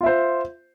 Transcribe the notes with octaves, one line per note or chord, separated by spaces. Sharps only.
F4 C5 E5